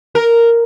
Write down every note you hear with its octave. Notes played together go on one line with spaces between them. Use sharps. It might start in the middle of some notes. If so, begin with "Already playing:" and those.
A#4